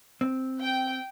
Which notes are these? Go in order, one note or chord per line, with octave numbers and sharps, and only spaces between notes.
C4
G5